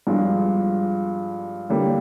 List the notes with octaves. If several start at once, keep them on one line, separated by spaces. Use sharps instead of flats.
G2 F3 G#3 D4 F4
D3 G3 A#3